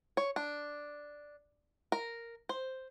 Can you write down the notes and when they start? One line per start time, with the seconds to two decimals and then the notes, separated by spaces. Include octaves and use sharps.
0.17 C#5
0.36 D4
1.92 A#4
2.49 C5